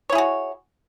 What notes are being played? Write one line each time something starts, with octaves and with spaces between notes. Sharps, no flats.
E4 F#4 G#4 C#5